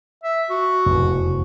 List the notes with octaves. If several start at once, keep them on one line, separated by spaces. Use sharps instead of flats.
E5
F#4
F1 E2